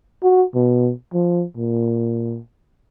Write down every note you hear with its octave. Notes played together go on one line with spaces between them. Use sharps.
F#4
B2
F3
A#2